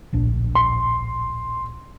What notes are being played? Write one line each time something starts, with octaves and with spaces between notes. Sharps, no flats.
D1 A#1 D4
C6